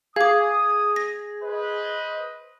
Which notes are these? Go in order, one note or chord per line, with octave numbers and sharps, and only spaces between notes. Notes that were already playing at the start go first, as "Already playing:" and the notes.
G#4 F5 D6 D#6
A#6
B4 C5 D#5